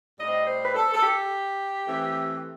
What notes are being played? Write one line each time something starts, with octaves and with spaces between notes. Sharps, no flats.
A2 G3 C4 D#5
C5
B4
A4
A4
G4
E3 A3 C4